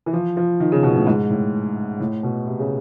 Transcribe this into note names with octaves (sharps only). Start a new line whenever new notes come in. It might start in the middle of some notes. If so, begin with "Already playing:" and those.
E3
F3
F3
D#3
C#3
B2
A2
G#2
A2
A2
B2
C3
C#3